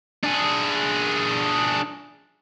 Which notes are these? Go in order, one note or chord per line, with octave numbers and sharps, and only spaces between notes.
D4 G#4